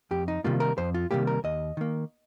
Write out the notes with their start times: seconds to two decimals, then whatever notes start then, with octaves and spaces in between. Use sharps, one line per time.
0.11 F2 G4
0.28 D#4
0.44 C3 D#3 G3 A#3 F4
0.60 A#4
0.78 F2 C5
0.94 F4
1.11 C3 D#3 G3 A#3 G4
1.27 A#4
1.44 D#2 D#5
1.77 D#3 A#3